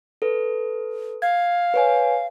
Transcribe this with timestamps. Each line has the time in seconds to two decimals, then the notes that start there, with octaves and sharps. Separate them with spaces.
0.22 A4 B4
1.22 F5 G#6
1.74 B4 C#5 G#5